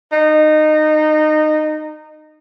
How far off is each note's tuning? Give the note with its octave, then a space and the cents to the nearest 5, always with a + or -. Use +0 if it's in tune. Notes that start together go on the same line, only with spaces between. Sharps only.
D#4 -20